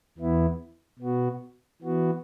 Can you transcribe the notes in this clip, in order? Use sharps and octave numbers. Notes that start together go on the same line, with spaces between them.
E2 E3 B3 E4
B2 B3 F#4
E3 B3 F#4